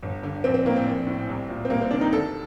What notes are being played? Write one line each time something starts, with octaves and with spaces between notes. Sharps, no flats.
G1
G2 D3
A#1 C4
C4
A2 A#3
C4
A#1
A2
C2
A#2
C4
C2 A#3
C4
C3 D#3 D4
D#4
D2 A4